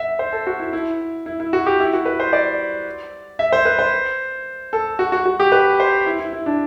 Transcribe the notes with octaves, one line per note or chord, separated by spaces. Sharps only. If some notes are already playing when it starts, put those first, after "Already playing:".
Already playing: E5 F#5
C5
A4
F#4
E4
E4
E4
E4
F#4
G4
E4
F#4
B4
C5
D5
E5
C5
B4
C5
A4
F#4
F#4
F#4
G4
B4
C5
E4
E4
E4
D4